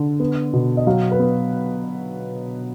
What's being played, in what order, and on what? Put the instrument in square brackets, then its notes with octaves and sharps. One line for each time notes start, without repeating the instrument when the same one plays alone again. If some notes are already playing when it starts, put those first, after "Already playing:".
Already playing: [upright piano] D3
B3
B2
D#5
F#3 F5
B4
B3